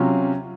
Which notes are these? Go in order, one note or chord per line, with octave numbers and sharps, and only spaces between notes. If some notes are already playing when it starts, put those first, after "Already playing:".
Already playing: C3 F#3 C#4 F4